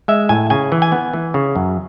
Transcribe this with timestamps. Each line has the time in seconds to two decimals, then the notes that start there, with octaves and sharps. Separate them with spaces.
0.08 G#3 E5
0.29 A2 G#5
0.50 C#3 G#5
0.72 E3
0.82 G#5
0.92 B3
1.13 E3
1.34 C#3
1.56 F#2